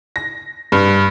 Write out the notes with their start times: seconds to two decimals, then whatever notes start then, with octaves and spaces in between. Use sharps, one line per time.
0.16 A#6
0.72 G2